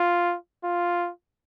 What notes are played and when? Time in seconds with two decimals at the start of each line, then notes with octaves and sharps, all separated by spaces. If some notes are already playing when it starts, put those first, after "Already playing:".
Already playing: F4
0.64 F4